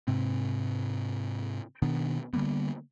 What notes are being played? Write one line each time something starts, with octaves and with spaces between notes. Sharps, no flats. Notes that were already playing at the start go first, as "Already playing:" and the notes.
G#2 C3 C4
B2 D#3 B3 D4
D3 G3 A#3 B3